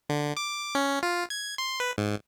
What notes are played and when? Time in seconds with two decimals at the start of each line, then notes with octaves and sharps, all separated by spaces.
0.10 D3
0.37 D6
0.75 C#4
1.03 F4
1.30 G#6
1.58 C6
1.80 B4
1.98 G#2